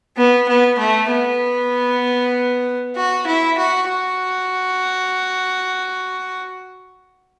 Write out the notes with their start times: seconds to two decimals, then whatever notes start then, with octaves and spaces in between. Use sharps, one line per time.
0.17 B3
0.48 B3
0.79 A3
1.10 B3
2.96 F#4
3.27 E4
3.58 F#4
3.89 F#4